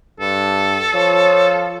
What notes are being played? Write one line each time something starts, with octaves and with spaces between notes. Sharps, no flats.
G2 A4
F3 C#5